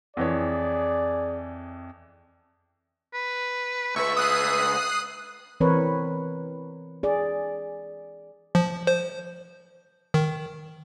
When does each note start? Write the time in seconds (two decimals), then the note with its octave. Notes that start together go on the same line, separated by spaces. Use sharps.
0.17 F2 E3 G#4 C#5 D5
3.14 B4
3.96 C#2 B4 E5 C#6
4.17 D#6 F#6 C7
5.60 E3 C4 A#4 B4 C#5
7.03 G#4 D5
8.55 F3
8.87 C5
10.14 D#3